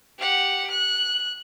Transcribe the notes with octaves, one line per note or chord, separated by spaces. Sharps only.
G4 F#5
F#6